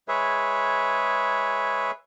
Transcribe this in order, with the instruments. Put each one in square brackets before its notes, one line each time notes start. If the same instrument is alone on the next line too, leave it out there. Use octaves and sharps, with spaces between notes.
[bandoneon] G#3 G#4 B4 C#5 E5